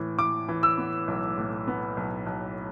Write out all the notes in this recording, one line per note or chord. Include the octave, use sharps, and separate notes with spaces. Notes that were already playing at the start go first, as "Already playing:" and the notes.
Already playing: A2 E3
E3 D6
E3
E6
B3
B1
A2
B3
B1
B1